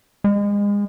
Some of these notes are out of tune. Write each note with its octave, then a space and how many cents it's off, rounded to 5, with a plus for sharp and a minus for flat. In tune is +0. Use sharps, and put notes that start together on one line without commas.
G#3 -30